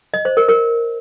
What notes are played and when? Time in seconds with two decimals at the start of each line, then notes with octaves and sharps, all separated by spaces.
0.14 D#5
0.25 C5
0.37 A#4
0.49 A#4